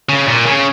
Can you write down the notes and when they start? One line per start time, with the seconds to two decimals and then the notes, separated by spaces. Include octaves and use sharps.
0.09 C#3
0.27 A#2
0.46 C#3